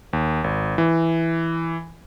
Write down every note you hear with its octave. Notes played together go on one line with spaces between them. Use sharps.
D#2
G#1
E3